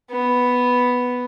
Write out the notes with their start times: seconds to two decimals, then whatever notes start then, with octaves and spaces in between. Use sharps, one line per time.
0.11 B3